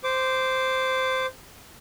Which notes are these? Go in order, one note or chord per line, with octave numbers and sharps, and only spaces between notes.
C5 D6